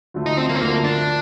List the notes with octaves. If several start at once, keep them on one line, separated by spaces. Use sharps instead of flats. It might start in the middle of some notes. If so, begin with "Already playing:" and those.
D2 D3 F3 A3
D#4
C4
A#3
C4
D2 D3 F3 A3 A#3
D4